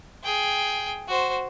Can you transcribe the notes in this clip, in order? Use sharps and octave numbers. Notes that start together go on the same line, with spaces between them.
G#4 G5
F#4 C5